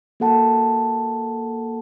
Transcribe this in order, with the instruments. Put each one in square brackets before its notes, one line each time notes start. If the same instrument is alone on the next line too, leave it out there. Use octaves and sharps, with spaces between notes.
[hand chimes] A#3 F#4 A4 F#5 A5